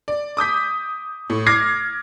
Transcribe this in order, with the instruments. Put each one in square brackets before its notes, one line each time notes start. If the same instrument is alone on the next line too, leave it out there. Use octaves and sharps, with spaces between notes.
[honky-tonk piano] D5
D6 D#6 G6 B6
A2
D6 F6 G#6 A#6 C7